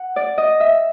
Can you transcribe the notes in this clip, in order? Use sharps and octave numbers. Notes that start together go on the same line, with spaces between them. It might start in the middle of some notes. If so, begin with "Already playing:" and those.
Already playing: F#5
D5
D#5
E5